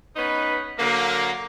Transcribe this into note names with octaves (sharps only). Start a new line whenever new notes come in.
B3 C#4 D#4 B4
D3 F#3 A#3